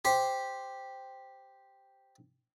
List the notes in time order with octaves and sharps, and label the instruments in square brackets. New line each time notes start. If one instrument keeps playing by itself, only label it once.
[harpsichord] G4 C5